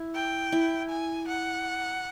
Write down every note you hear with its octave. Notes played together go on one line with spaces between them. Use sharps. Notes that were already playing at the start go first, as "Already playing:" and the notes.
Already playing: E4
G5
E4
G#5
F#5